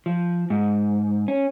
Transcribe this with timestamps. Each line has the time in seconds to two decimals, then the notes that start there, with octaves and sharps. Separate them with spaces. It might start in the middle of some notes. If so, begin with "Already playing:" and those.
0.06 F3
0.50 G#2
1.28 C#4